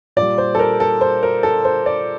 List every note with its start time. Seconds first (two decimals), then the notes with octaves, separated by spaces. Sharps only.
0.16 A#2 G3 D5
0.38 C5
0.55 A4
0.59 A#4
0.80 A4
1.01 C5
1.23 A#4
1.43 A4
1.65 C5
1.86 D5